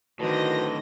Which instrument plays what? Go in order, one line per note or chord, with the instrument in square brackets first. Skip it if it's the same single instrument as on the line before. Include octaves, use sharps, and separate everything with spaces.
[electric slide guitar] A2 D3 [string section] D#3 D#5 A#6 [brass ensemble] F#4 C5 [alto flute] B4